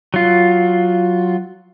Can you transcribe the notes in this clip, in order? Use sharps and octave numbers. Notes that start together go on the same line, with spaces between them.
F#3 F4